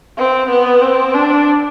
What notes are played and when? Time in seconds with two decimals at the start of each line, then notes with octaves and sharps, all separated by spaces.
0.18 C4
0.49 B3
0.82 C4
1.14 D4